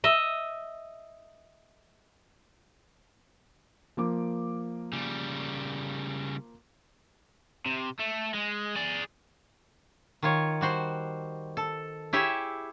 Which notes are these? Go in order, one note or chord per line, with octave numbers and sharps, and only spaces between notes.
D#5 E5
F3 A#3 D6
C#3 G3
C3
A3
G#3
G#4 D5
D#3 F4 C#5
G3 F#4 C5
A4
E4 G4 G#4 C#5 E5